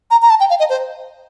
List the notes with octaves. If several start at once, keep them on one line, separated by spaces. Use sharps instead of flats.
A#5
A#5
A5
G5
F5
D#5
C5